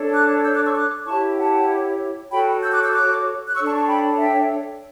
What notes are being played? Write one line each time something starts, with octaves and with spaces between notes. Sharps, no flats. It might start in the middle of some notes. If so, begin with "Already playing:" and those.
Already playing: D4 A4 C#5
D6 F#6
E6 G6
D6 F#6
C#6 E6
D6 F#6
E4 G4 C#5 A5 C#6
F#5 A5
F#4 A4 C#5 G5 B5
E6 G6
D6 F#6
E6 G6
D6 F#6
F#6
D4 A4 C#5 C#6 E6
A5 C#6
A5 C#6
G5 B5
E5 G5